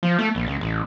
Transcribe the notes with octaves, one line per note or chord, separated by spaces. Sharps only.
F3
A3
A#1
C#2
A1